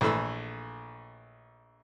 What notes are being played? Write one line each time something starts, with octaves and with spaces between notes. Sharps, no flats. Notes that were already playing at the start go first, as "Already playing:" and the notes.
A#1 E3 A3 B5 E6